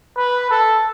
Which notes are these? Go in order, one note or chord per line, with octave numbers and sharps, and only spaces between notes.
B4
A4